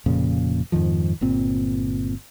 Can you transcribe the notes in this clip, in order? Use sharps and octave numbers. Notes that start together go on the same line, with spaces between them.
F1 F2 A#2 C#3
F2 G#2 D#3 F3
G1 A#2 C4